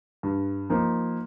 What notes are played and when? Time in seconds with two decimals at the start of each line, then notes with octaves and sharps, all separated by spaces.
0.23 G2
0.70 F3 A#3 D#4